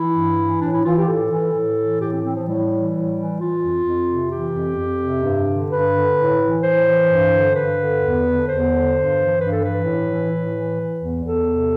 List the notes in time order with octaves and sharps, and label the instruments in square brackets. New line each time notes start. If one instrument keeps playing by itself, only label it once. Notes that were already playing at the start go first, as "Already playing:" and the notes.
Already playing: [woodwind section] E3 E4
G2
E3
A2 D4
E4
E3 F4
G4
A2 A4
E3
A2
E3
A2 G4
C4
E3 C4
F3
A2 G3
E3
A2
E3
E3 F4
F2
F2
C3
E3 G4
F2
F2
C3
G2
D3
G2 B4
D3
A2
E3
A2 C5
E3
G2
D3
G2 B4
D3
E2
D3
E2 C5
D3
G2
E3
G2 B4
A4
E3 B4
A2
E3
A2
E3
E3
E2
E2 A4
C3